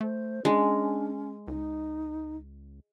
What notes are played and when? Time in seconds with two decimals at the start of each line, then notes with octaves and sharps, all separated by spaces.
0.01 A3 C5
0.45 G#3 C#4 D4
1.48 C#2 D#4